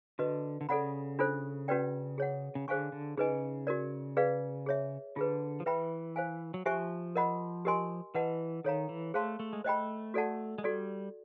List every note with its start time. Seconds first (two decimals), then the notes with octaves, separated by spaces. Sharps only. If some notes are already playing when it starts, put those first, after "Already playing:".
0.19 D3 F#4 B4 D#5
0.61 D3
0.69 C#3 A4 D5 F#5 B5
1.19 D4 F4 A4 C5
1.68 C#4 F#4 B4 D5 G5
2.18 G#4 C#5 F#5
2.55 C#3
2.68 D3 G#4 C5 F5 G#5 C#6
2.92 D3
3.17 C#3 D#4 G#4 B4 D#5 G#5
3.67 F#4 A#4 D5
4.17 G#4 B4 D5 F5
4.66 G#4 C#5 E5
5.16 D3 F4 G#4 B4
5.60 F3
5.66 E3 B4 E5 G5 B5
6.16 C5 F5 G#5
6.54 F#3
6.65 F3 G4 C5 E5 G#5 C#6
7.15 A#4 D#5 F#5 B5
7.65 G4 A#4 D#5 G#5 C6
8.15 E3 B4 D#5 F#5 A5
8.64 D#3 A4 C#5 F5 A#5
8.89 E3
9.14 A3 G#4 C5 F5 A5 C6
9.40 A3
9.53 G#3
9.64 A3 C5 D#5 G5 B5
10.14 F#4 A4 D5 F#5 A5
10.58 G#3
10.63 G3 F#4 A4 D5